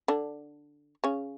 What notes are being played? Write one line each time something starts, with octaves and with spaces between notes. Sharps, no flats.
D3 D4
C#3 C#4